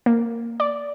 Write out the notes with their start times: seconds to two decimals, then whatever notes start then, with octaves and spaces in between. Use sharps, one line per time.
0.06 A#3
0.60 D5